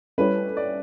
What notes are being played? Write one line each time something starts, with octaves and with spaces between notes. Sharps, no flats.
G3 C#4 E4 A4 B4 C#5
D5